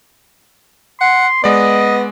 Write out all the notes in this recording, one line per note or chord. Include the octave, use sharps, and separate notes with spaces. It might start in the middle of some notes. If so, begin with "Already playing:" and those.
F#5 C6
G#3 B3 D5 D#5